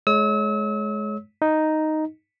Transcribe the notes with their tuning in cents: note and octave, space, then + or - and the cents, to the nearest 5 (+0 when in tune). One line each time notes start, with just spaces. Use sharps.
G#3 +30 C#5 +0 E6 -40
D#4 +0 D#5 +0